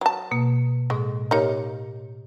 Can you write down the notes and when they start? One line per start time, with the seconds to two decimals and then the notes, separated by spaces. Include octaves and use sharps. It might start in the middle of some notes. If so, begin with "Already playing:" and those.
0.01 F#3 A5 A#5
0.31 B2 A#3
0.90 A2 G#3
1.31 A#3 D#4 G4 C#5